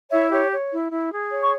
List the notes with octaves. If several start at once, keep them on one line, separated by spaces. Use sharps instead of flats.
E4 C#5 E5
G4 C#5
C#5
E4
E4
G#4
C#5
C#6